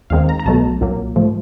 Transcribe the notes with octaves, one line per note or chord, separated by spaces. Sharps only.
D#2 D#3 G#3 C4 F5
A#5
A#5
B1 B2 F#3 A3 A5
C2 A#2 F#3 A#3
G#2 F3 A3